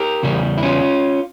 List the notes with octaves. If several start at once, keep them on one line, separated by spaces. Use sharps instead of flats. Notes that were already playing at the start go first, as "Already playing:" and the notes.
Already playing: G4 A#4
E2 C#3 G3
E4
C#4 F4